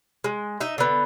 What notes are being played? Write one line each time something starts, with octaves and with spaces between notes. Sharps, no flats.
G#3
D#4 E5
D3 B3